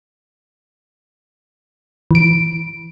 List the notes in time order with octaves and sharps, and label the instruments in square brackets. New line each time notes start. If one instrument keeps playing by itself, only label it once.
[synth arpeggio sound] E3 D7